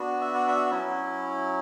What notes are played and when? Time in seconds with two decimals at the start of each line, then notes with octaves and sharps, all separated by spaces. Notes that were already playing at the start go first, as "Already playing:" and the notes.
Already playing: B3 D4 F#4
0.21 E5
0.34 D5
0.48 E5
0.71 F#3 C#4 E4